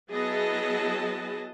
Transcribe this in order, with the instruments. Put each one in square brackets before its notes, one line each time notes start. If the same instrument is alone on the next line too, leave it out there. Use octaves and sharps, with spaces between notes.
[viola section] F#3 B3 E4 G#4 D#5 A5